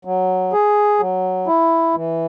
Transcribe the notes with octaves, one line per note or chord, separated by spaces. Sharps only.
F#3
G#4
F#3
E4
E3